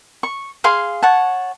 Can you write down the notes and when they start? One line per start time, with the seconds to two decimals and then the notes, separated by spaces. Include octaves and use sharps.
0.23 C#6
0.64 G#4 F5 C6
1.03 C#5 F#5 A5